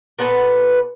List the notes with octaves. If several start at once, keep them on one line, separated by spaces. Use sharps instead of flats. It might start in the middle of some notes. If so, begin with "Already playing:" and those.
A#2 B3 A4 B4